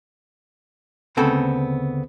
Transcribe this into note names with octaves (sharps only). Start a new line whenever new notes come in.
D2 C#3 B3 C4 A4